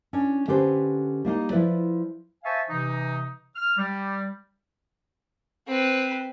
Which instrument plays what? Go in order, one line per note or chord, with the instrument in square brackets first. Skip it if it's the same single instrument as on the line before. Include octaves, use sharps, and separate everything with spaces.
[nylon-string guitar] C#4 D4
D3 C#4 G4 A4 B4 C5
G3 A#3 D4 D#4
F3 E4 B4 D5
[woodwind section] C5 E5 F5 G#5 A5 C#6
C3 E3 D#4
F6
G3
[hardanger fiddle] C4 B4